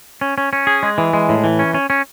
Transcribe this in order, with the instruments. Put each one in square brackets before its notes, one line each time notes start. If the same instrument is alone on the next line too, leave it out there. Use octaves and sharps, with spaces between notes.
[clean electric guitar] C#4
C#4
C#4
G#4
G#3
E3
G#3
A2
E3
C#4
C#4
C#4